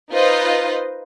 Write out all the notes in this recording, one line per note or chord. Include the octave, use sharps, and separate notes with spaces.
D#4 F4 B4 C5 D#5